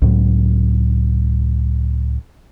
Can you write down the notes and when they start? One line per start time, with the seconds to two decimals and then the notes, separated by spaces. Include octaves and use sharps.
0.02 C#2 A2 F#3